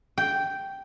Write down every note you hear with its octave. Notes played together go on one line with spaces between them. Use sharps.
G5